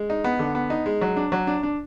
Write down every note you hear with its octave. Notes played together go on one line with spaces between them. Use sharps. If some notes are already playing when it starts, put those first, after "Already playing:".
Already playing: G#3
D#4
B3
D3
B3
D#4
G#3
F#3
D4
F#3
D4
D4